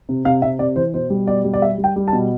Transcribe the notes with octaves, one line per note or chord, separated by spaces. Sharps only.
C3
C3 F5
C3 E5
C3 D5
E3 C5
B2 C5
G3
B2 D5
G3
D5
G3 E5
G3
G5
G3
A5
B2